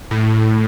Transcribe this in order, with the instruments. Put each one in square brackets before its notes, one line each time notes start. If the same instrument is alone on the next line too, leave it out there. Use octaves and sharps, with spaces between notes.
[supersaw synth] A2